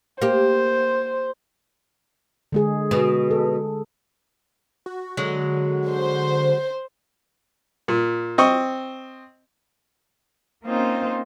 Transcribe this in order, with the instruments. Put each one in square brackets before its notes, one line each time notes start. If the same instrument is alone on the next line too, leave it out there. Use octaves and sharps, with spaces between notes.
[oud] A#3 G4 [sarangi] C5
[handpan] D3 G#3 G#4
[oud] B2
[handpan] A4
[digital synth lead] F#4
[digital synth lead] D3 [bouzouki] F#3 G#3 F#4
[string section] C5
[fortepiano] A#2
C4 D#5 C#6
[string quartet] A#3 C4 C#4 D#4 F4 C5